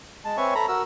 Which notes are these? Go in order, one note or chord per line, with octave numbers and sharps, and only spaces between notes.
G#3 A5
C4 B4 C#5 E5 G#5 C#6
A4 A#5 B5
F#4 A#4 E6